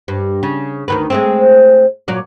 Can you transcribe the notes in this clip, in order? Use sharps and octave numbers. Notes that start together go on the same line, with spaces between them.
G2
C#3
D2 D#3 B4
G#3 A3 C4
A#2 F#3 D5